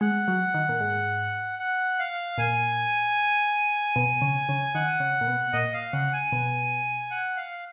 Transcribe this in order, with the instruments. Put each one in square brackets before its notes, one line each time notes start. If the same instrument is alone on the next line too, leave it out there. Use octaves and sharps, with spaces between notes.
[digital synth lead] G#3 [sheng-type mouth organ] F#5
[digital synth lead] F#3
D#3
A#2
G#2
[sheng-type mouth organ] F#5
F5
[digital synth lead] A#2 [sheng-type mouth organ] G#5
[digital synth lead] B2
C#3
C#3
[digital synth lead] D#3 [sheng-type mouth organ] F#5
[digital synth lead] C#3
A#2
B2
[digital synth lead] A#2 [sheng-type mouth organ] D#5
[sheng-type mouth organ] F5
[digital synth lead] C#3 [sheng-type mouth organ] F#5
[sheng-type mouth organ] G#5
[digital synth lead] B2
[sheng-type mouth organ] F#5
F5